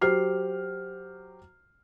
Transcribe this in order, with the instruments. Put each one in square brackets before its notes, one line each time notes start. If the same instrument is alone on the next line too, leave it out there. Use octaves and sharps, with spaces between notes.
[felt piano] F#3 G4 C5 F6 C7